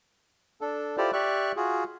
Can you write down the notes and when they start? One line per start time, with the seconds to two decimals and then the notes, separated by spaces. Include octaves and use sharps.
0.61 D4 A4
0.97 E4 F4 G4 A4 C5 D5
1.13 G4 D5 E5 C#6 F#6
1.56 F4 F#4 G#4